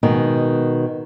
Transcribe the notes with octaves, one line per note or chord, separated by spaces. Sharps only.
B2 D#3 G#3